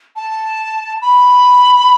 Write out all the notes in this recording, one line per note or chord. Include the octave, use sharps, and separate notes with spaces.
A5
B5